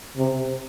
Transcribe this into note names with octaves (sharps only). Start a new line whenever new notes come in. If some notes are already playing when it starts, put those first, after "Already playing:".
C3